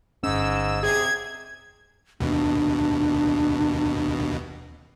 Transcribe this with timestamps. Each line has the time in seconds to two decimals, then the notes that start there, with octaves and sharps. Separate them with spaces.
0.23 G1 G#2 C#4 E6
0.83 C3 G#4 G#6
2.20 D#2 B2 D4